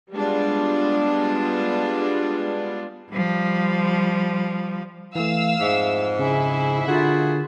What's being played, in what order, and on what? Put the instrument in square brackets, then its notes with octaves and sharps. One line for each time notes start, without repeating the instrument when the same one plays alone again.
[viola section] G3 G#3 B3 D4 F4
[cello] F3 G3
[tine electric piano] E3 A3 [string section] F5 E6
[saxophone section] F2 G#2 [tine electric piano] E5
[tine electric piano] C#3 [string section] E4 E5 [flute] G#5
[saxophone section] A#2 F#4 G#4 [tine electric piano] D3 [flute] F4